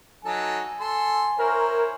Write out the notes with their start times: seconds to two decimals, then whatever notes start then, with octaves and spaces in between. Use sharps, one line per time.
0.25 F#3 D#4 A4 G#5
0.80 A4 C6
1.38 E4 A#4 C5 C#5